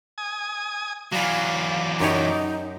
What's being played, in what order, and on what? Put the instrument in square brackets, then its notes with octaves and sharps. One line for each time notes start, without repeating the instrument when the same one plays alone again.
[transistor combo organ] G#5 D#6
[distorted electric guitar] E3 F#3 [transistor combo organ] D5 [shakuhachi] F5
[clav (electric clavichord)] F#2 G4 C#5 [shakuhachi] D#4